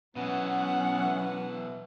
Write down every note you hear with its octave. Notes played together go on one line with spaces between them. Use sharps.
B2 E3 F#3 B3 C#4 F#5